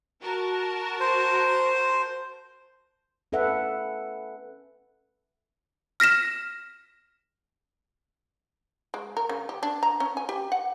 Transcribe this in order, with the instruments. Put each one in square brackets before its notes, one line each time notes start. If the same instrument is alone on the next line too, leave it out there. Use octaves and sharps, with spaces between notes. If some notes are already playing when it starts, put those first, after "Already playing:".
[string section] F#4 A#4 A5
[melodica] C5
[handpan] C#4 A4 B4 E5 F#5
[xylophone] F6 A#6 B6 E7
[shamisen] G#3
A#4
C#3
G4
D4
A#5
C#4
G#5
G4
F#5